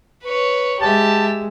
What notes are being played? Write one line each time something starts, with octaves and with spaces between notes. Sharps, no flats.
B4 C#5
G#3 G4 E5 A5